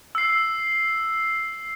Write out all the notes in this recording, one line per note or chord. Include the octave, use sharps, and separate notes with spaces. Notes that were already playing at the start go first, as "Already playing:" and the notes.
E6 C7